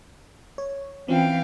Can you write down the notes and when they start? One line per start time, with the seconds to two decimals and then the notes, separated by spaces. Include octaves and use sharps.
0.58 C#5
1.08 E3 C4 C#4 F4 F5 G5